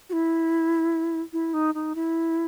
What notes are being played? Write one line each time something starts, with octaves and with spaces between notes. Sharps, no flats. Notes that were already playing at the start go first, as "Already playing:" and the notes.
F#4
E4
E4
D#4
D#4
E4